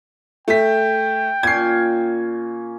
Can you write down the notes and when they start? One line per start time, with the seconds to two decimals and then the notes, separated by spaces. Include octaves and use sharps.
0.48 A3 G5 B6
1.43 A#2 C#4 G#6 C7